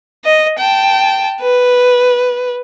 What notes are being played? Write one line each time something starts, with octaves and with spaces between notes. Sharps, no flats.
D#5
G5 A5
B4